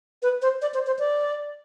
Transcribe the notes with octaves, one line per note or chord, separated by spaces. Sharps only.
B4
C5
D5
C5
C5
D5